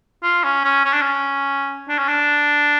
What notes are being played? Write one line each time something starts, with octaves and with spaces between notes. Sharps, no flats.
F4
C#4
C#4
C#4
D4
C#4
D4
C#4
D4